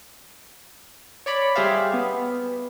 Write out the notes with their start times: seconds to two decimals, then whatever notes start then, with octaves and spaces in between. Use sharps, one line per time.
1.26 C#5 D5 B5
1.55 G3 G4 G#4 C5 E5 F5
1.93 B3